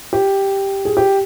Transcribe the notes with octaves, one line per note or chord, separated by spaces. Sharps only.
G4
G#4
G4